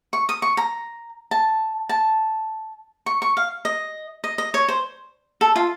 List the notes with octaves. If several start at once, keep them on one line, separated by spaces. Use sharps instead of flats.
C#6
D#6
C#6
A#5
A5
A5
C#6
C#6
F5
D#5
D#5
D#5
C#5
C5
A4
F4